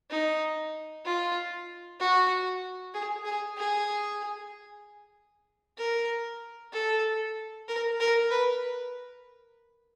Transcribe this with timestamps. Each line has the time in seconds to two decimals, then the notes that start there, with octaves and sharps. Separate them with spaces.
0.10 D#4
1.05 F4
2.00 F#4
2.94 G#4
3.25 G#4
3.57 G#4
5.78 A#4
6.73 A4
7.68 A#4
8.00 A#4
8.31 B4